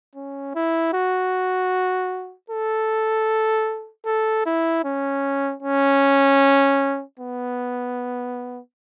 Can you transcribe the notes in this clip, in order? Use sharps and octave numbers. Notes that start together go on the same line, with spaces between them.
C#4
E4
F#4
A4
A4
E4
C#4
C#4
B3